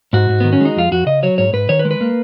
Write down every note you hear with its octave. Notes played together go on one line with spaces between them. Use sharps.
G#2 F#4
G#2
D#3 B3
C#4
G#3 D#4
F2 F4
F2 F#4
C#3 D#5
F#3 C#5
G#2 C#5
G#2 B4
D#3 C#5
B4
G#3
B4
A#3